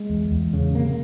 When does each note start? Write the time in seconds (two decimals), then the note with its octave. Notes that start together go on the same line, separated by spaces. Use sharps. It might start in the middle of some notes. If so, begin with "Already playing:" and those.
Already playing: G#3
0.10 E2
0.31 E2
0.53 C#3
0.74 C3 A#3